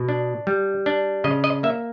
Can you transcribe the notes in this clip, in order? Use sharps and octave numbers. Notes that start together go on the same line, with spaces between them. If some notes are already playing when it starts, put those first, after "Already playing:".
Already playing: B2
D4
G3
D4
C#3 D#5
D#5
A#3 E5